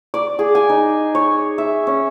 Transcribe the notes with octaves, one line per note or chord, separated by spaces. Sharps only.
D5
G#4
G#5
D#4
C#5
E5
C#4